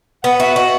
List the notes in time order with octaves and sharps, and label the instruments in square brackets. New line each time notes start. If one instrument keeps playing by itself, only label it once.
[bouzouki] B3 [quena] F#5
[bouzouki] F#4 [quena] E5
[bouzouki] F#4 [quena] D#5